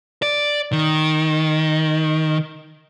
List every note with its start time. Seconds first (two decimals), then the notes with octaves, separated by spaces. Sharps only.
0.22 D5
0.72 D#3